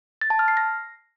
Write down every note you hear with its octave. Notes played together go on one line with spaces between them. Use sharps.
A6
A5
F6
C7
A#6